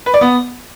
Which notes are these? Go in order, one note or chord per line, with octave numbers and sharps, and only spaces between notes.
B4
D5
B3